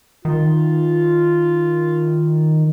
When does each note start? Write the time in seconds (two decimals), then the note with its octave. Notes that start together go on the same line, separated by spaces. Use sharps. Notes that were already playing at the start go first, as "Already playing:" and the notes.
0.25 D#3 F4